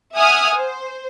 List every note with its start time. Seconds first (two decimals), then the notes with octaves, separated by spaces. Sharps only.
0.16 E5 F#5 G#5 D#6 F6
0.56 C5